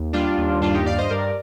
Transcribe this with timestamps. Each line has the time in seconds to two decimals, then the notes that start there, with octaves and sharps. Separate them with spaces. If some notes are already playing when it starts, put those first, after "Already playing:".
Already playing: D#2
0.13 G3 D4 F4
0.38 D#2
0.62 G2 D4 F4
0.74 D#4 G4
0.86 G2 D5 F5
0.98 C5 D#5
1.10 G2 A#4 D5